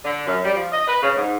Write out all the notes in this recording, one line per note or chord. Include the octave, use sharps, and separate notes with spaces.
D3
F#2
G3
F3
D#5
B4
C#3
G#2